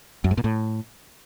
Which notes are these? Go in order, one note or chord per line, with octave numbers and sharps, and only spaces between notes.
F#2
G#2
A#2
A2